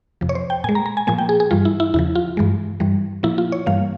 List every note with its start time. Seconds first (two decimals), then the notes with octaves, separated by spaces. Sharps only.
0.21 F2 C3 F3
0.29 C#5
0.35 C5
0.50 G5
0.64 A#2 G#5
0.69 G#3
0.75 A#5
0.86 A#5
0.97 G#5
1.07 A#2 F3 A#3 G#5
1.18 G5
1.29 G#4
1.40 G#4
1.51 G2 E3 G3 F4
1.65 E4
1.80 E4
1.94 E2 C#3 F3 E4
2.15 F4
2.37 G2 E3 G#3
2.80 G2 E3 G3
3.23 A#2 F3 A#3 E4
3.38 F4
3.52 C#5
3.66 G2 E3 G3 A#3 F5